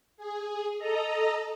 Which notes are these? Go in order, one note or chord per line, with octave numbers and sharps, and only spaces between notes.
G#4
A4 D#5 A#5